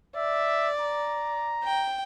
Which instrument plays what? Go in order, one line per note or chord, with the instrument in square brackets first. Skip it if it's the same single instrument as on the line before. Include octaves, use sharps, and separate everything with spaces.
[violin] D5 [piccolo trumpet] E5
[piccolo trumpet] A#5
[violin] G5